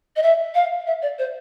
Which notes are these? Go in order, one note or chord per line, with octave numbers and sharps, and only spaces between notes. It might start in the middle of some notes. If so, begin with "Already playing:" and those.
D#5
E5
F5
E5
D5
C5